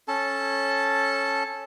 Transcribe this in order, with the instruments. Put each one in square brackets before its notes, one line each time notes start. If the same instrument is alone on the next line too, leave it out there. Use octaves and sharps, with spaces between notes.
[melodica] C#4 A4 A5